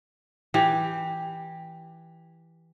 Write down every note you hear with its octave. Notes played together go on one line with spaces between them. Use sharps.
E3 G4